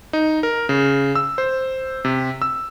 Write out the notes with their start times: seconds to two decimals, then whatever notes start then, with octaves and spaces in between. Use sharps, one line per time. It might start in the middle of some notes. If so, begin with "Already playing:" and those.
0.13 D#4
0.43 A#4
0.69 C#3
1.15 E6
1.38 C5
2.05 C3
2.42 E6